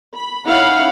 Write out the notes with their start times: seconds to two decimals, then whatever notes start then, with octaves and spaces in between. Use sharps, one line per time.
0.14 B5
0.46 C#4 D#4 E4 F5 F#5 B5